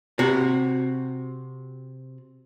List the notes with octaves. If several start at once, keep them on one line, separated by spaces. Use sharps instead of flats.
C3 F#4